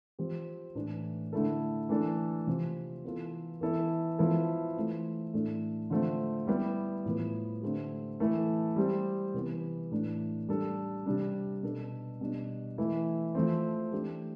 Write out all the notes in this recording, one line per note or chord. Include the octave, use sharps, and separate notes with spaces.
F3 C4 G4
A2 E3 A3 D4
D3 A3 E4 A4
E3 A3 D4 A4
C3 F3 C4
E3 B3 F4 A4
E3 B3 E4 A4
F3 B3 E4 A4
E3 A3 C4 F4
A2 E3 A3 D4 A4
D3 F3 A3 C4
G3 B3 E4 G4
A2 F3 B3
D3 A3 C4 G4
E3 A3 E4 A4
G3 C4 G4
C3 E3 B3
A2 E3 A3 D4
G3 D4 A4
C3 G3 D4
B2 B3 D4 A4
B2 G3 B3 D4
E3 A3 E4
F3 A3 C4
E3 A3 D4 G4